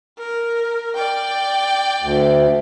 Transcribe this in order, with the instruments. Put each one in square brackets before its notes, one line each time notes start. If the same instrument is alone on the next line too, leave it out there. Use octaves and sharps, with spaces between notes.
[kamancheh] A#4
D5 G5
[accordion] D2